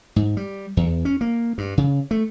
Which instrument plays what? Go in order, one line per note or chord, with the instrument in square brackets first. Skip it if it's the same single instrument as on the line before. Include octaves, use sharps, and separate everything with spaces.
[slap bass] G#2
G3
E2
C#4
A#3
G2
C#3
A3